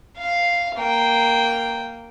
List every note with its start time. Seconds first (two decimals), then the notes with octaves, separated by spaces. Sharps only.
0.18 F5
0.76 A#3 G5